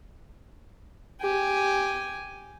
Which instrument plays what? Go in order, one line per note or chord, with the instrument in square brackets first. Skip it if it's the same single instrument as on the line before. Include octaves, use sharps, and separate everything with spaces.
[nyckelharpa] G4 G#5